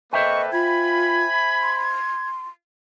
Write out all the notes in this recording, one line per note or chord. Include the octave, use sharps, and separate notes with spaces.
A#3 A4 B4 C5 D#5 E5 G5 C#6
F4 G#5 B5 G#6
C6